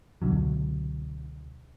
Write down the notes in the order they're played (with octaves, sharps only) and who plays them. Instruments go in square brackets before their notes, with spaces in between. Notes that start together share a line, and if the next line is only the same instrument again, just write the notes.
[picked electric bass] C#2 B2 D3 F#3